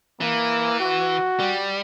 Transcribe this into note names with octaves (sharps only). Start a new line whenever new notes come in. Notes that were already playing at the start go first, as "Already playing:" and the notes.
E3 A#3
F#4
G3